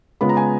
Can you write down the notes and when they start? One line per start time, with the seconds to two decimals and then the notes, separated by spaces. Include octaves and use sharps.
0.21 C#3 G#3 B3 F4 B5
0.29 A#5
0.37 G#5